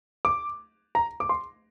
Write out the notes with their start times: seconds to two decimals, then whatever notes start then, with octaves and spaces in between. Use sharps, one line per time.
0.25 D6
0.95 A#5
1.20 D6
1.29 C6